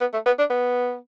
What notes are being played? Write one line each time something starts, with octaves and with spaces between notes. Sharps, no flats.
B3
A3
B3
D4
B3